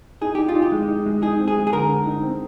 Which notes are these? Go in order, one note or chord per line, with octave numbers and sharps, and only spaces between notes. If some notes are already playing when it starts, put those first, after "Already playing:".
D#4 G#4
D#4 G4
F4
D#4
G4
G#3
D#4
G#3
D#4 G#4
C4
G#4
G#3
G#4
D3 A#4
D3
D#4
C4